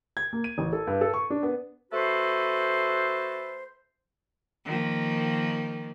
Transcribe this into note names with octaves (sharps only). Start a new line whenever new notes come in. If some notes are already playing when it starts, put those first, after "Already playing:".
G#6
A#3
D#7
A1
A4
G2
A4
C#6
D4
B3
A3 F#4 A4 B4 C5
D#3 F3 A#3